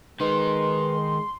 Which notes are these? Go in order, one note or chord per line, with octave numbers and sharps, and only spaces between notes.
D#3 G#3 D#4 B4 C6